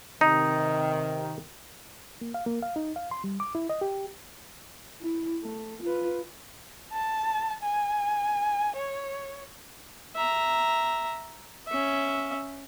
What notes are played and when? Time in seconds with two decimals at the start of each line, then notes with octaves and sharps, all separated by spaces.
0.21 C3 D#3 D#4
2.21 A#3
2.34 F5
2.46 A#3
2.62 F5
2.76 D#4
2.96 F5
3.11 C6
3.24 G3
3.40 D6
3.55 E4
3.70 D#5
3.81 G4
5.01 E4
5.44 A3
5.83 F4 B4
6.93 A5
7.63 G#5
8.76 C#5
10.15 E5 A#5
11.68 C#4 E5